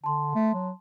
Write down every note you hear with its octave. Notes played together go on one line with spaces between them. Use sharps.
D3 A5 C6
A3
F#3